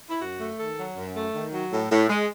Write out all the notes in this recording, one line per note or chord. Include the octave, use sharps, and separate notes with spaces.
E4
F#2 F#4
A3
D#3 A4
F#3
F#2
A3
D#3
F#3
A2
A2
G#3